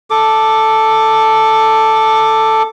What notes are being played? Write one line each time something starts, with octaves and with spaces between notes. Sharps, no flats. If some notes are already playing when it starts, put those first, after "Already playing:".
A4 D6